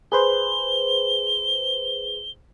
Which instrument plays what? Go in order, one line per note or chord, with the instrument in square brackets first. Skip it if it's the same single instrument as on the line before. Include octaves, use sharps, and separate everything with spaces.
[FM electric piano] G#4 B4 C5 [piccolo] G7